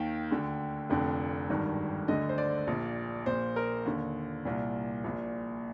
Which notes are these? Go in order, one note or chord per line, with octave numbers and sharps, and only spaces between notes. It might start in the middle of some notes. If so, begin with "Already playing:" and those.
Already playing: D#2 D#3 G5
D2 D3
F1 F2 D3
G#1 G2 D#3
D2 D3 D#5
C5
D5
A#1 A#2
A#1 A#2 C5
A#4
D#2 D3
C2 A#2
A#1 A#2